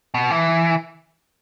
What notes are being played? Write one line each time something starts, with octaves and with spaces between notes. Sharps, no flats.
B2
E3